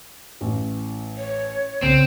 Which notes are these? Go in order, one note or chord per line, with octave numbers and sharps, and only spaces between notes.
A1 A2
C#5
B1 C#3 C4